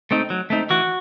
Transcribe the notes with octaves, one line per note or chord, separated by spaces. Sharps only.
A3 C4 D#4
F#3
A3 C4 D#4
E3 F#4